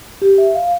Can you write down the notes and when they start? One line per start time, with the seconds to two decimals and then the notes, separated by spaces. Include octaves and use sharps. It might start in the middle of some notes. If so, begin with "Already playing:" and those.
0.22 G4
0.38 E5
0.55 F5